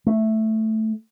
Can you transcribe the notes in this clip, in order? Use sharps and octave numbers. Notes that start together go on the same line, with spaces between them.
A3